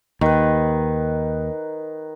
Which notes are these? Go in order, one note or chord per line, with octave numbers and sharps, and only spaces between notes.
D#2 D#3 B4